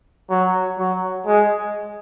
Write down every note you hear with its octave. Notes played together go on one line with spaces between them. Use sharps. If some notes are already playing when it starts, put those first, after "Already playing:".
F#3
F#3
G#3